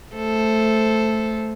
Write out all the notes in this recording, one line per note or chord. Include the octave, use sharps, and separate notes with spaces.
A3 A4 C5